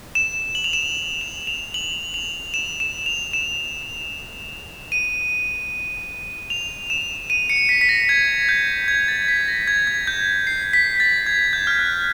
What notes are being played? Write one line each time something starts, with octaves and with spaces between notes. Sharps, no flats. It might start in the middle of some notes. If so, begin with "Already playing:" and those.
E7
F#7
F7
E7
F7
F7
F7
F#7
F7
E7
E7
F7
E7
D#7
F7
E7
D#7
C#7
B6
B6
A#6
G#6
G6
G#6
A6
B6
A#6
G#6
G#6
G6
C7
B6
A6
G#6
G6
F6
F#6